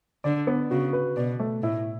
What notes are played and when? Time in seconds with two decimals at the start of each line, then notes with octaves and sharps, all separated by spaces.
0.24 D3 D5
0.47 B3
0.71 C#3 F#4
0.93 B4
1.17 B2 D5
1.39 A3
1.62 A2 E4